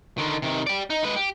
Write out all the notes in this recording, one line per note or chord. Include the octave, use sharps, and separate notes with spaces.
D3 D#3
C3 D#3
G4 D5
D#4
G#3 B4
G4